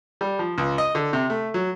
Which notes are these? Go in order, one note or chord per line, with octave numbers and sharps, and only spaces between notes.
G3
F3
C#2
D#5
D3
C3
A3
F#3